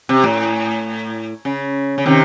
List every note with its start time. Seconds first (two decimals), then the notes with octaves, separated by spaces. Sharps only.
0.09 C3
0.24 A2
1.45 C#3
1.98 C#3
2.06 C3 D#3